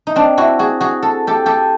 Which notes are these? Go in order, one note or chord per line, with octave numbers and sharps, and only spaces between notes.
D#4
C4 D4
E4 F#4
F#4 G#4
F#4 G#4
A4
G4 A4
G4 A4